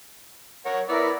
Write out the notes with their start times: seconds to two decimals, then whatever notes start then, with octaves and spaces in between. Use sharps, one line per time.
0.65 A#4 C#5 F#5
0.88 B3 E4 A#4 D5 E6